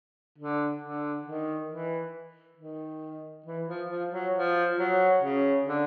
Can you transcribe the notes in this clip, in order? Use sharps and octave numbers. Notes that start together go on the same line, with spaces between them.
D3
D3
D#3
E3
D#3
E3
F3
F3
F#3
F3
F#3
C#3
D3